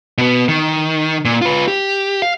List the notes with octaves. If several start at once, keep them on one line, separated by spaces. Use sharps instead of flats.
B2 B3
D#3
A#2
F4 B4
G4
F5